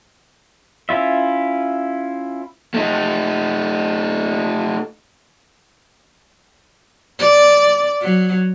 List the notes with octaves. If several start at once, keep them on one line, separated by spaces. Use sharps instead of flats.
C#4 E4 F4 E5
A3 D#4
D5
F#3